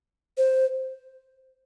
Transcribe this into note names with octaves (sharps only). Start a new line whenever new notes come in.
C5